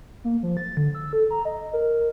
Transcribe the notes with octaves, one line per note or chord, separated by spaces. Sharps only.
A#3
F3
A6
D3
E6
A4
A#5
D#5
A#4